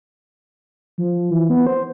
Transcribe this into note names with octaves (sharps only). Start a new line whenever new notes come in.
F3
E3
B3
C5